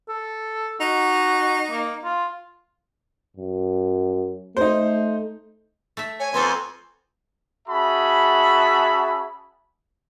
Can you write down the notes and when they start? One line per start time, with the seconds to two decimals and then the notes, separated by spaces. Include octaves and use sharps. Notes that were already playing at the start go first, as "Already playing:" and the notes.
0.08 A4
0.81 D#4 F#4
1.70 A#3
2.04 F4
3.36 F#2
4.57 A3 D#4 C5
5.97 A3 E5
6.20 C#5 G#5
6.34 F2 B3 C4 A4 C6
7.68 C#4 F#4 G#4 E5 A5 B5